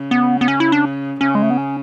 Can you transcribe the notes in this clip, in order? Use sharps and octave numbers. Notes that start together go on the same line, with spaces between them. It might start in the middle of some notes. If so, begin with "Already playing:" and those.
Already playing: C#3
B3
B3
C#4
E4
D4
C#3 C#4
G#3
A3
B3
C#4